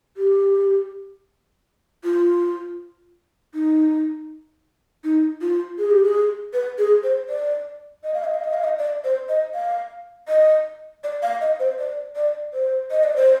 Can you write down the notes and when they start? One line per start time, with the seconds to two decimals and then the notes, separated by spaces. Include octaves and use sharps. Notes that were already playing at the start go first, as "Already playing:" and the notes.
0.17 G4
2.04 F4
3.54 D#4
5.04 D#4
5.41 F4
5.78 G#4
5.91 G4
6.04 G#4
6.53 B4
6.78 G#4
7.04 C5
7.29 D5
8.04 D#5
8.14 F5
8.24 D#5
8.34 F5
8.44 D#5
8.54 F5
8.64 D#5
8.79 D5
9.04 C5
9.29 D#5
9.54 F5
10.28 D#5
11.04 D5
11.22 F5
11.41 D#5
11.60 C5
11.79 D5
12.16 D5
12.54 C5
12.91 D#5
13.04 D5
13.16 C5